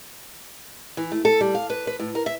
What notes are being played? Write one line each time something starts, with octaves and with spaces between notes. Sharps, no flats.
E3
A3
A4
G3
F5
B4
B4
A2
A#4
E5